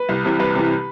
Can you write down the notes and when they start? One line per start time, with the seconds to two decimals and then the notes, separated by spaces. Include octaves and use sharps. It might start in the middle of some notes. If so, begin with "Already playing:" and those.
Already playing: B4
0.09 C2
0.25 C3 E3
0.39 C2 B4
0.55 C3 E3